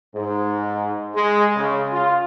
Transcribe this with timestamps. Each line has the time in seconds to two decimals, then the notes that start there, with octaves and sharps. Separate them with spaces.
0.14 G#2
1.15 G#3
1.55 C#3
1.92 F4